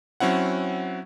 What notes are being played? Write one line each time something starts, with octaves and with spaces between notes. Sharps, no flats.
F#3 C4 C#4 E4 F#5